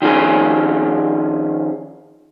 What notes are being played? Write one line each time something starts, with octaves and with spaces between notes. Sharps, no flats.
D#3 F3 C#4 G#4